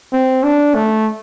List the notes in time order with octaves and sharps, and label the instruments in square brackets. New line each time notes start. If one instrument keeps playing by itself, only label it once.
[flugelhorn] C4
D4
A3